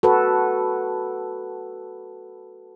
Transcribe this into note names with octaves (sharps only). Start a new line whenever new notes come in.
F#4 A4 B4